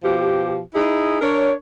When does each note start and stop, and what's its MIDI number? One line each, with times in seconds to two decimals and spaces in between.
0.04 0.59 47
0.04 0.59 53
0.04 0.59 67
0.74 1.17 63
0.74 1.17 64
0.74 1.17 68
1.22 1.53 62
1.22 1.53 70
1.22 1.53 73